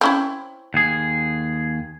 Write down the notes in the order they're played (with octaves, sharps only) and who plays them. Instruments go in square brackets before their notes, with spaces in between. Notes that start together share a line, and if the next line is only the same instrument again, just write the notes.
[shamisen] C4 C#4 E4
[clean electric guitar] D#2 G#4